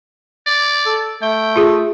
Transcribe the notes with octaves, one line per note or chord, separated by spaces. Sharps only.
D5
A4
A3 G5
F4 G#4